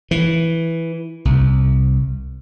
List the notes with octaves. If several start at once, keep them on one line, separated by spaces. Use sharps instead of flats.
E3
C2